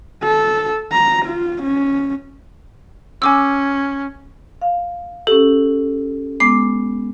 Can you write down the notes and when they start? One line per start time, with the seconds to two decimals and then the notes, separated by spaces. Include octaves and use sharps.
0.23 A4
0.92 A#5
1.26 F4
1.62 C#4
3.22 C#4 G#5 D6 E6
4.61 F5
5.27 C#4 G4 A4
6.40 G#3 B3 D6 C7